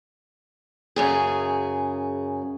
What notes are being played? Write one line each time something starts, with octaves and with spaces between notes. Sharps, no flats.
F#2 C#3 G#4